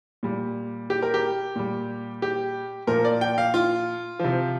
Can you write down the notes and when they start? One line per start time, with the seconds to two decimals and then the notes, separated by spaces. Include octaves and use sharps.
0.23 A#2 G3
0.90 G4
1.02 A#4
1.14 G4
1.56 A#2 G3
2.22 G4
2.87 A#2 F3 A#4
3.05 D5
3.21 G5
3.38 F5
3.54 F4
4.19 C3 F3